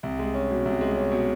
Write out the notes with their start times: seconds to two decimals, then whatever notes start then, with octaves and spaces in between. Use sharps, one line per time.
0.03 C2
0.19 G#3
0.34 C#4
0.50 B2
0.65 C2
0.81 G#3
0.96 C#4
1.12 B2